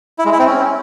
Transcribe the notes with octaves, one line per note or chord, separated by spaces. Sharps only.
E4
G#3
E4
C4
C#4